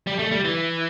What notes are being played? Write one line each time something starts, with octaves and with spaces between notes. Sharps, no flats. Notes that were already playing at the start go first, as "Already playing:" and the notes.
G3
A3
G3
E3